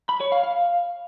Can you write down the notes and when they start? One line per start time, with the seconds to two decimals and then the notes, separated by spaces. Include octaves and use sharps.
0.09 B5
0.20 C#5
0.32 F5
0.43 F5